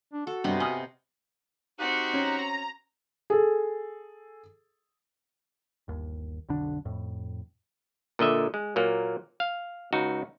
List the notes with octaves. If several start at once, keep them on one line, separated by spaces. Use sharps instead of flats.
D4
F#4 A4
G2 C3 B3 D#5
D#5 G#5 D#6 F6
C4 D#4 F#4 G4 F#6
C#4 A#5
G#4 A4
G1 D#2
B1 F2 D3 D4
F2 A2
A#2 D3 D#5 E5
G#3
A#2 F#3 A#3
F5
C#2 D#4 F#4